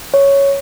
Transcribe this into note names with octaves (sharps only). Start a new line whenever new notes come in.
C#5